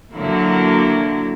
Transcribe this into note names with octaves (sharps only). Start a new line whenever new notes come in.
D3 F#3 A#3 E4